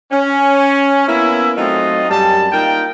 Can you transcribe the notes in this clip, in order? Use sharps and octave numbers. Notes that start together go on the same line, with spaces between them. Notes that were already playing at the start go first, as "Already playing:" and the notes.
C#4
A#3 B3 C#4 E4
F#3 A3 C4 D#4 F4 D#5
F#2 G3 A5
A#3 D#4 F4 A#4 G5